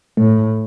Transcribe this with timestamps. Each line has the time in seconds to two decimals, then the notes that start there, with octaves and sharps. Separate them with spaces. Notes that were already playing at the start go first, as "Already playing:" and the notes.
0.17 A2 A3